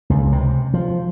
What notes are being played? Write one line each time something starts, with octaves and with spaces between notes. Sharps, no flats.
C#2
C3
F3